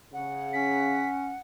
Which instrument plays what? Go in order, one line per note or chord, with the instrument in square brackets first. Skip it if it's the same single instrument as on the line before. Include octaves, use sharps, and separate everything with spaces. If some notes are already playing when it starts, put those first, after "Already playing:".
[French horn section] C#3 [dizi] F#5
[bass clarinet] C#4 [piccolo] B6